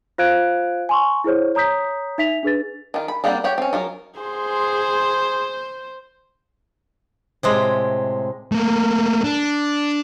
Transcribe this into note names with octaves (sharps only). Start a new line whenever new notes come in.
F4 C5 F5 F#6 G#6 D7
G#5 C6 C#6
E4 G#4 C5 C#5
C#5 A#5 D#6 G6 B6
D#4 E5 B6 F7
D4 G#4 B4 A6
D#3 F4
B5
G3 A#3 C4 D4 F#5
G4 C#5 F#5
C4 C#4
F#3 F4 A#4
G#4 C5 C6
A2 C3 G#3
A3 A#3
D4